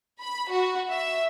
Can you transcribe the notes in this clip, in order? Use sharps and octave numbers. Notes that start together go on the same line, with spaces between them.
B5
F#4
E5